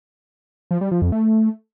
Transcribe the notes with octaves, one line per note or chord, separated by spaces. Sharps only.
F3
G3
F3
F2
A3